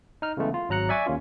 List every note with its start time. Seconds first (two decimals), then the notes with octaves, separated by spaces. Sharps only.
0.22 D#4 F6
0.37 C#3 E3 G#3 A3 B3
0.54 F4
0.69 G#1 F#3 A#5 F#6 C#7
0.89 D5 E5 G#5 C#6 D6
1.06 D#2 A#3 C#4 F4